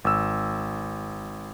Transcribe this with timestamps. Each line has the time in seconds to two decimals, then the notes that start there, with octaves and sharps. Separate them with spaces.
0.05 G#1 E6